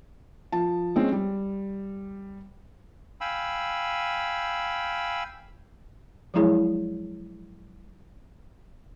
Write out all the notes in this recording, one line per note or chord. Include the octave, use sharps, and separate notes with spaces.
F3 A5
G#3 C4 C#4
G3
F5 G5 G#5 B5 E6
F3 F#3 G#3 E4 G#4 C#5